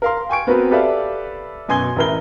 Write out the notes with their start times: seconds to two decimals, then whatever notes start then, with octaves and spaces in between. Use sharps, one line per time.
0.02 A#4 F5 C6
0.29 G5 G#5 C#6 D7
0.47 B3 C4 F#4 A#4 B4
0.71 G4 A4 B4 D5 E5 F5
1.68 F#2 B2 G#5 C6 G#6 G7
1.96 A1 E4 A#4 B4 G7